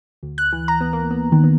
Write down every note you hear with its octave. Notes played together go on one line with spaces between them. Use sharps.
D2
F#6
E3
A#5
B3
A#3
B3
D#3
B3